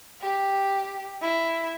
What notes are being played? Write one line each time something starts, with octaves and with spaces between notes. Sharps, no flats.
G4
E4